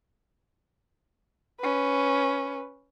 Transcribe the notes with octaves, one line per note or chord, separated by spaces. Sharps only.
C#4 B4